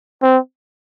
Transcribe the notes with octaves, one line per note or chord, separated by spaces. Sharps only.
C4